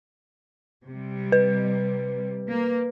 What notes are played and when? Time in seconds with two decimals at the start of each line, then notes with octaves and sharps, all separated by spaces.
0.86 C3 G3
1.32 B4
2.51 A#3